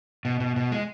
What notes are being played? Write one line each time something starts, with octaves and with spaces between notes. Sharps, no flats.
B2
B2
B2
G#3